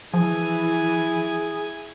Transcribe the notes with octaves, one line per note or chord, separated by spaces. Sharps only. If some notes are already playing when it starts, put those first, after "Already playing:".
E3 F3 E4 G#4 G#5